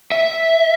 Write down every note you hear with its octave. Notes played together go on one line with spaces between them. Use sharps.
E5